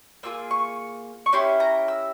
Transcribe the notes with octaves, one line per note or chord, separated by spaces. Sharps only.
A#3 F4 G#4 E6
C#6
C#6
C#4 E4 G4 C6
A#5
E6